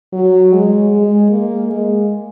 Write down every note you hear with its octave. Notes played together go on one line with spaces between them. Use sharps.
F#3
G#3
G#3
A#3
G#3